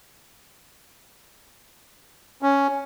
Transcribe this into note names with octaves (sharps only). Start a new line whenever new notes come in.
C#4